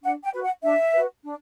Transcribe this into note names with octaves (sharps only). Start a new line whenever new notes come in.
D4 F#5
G5
F#4 B4
F#5
D4 E5
F#4 B4
D4